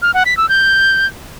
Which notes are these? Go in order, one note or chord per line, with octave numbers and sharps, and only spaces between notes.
F6
F#5
B6
E6
G6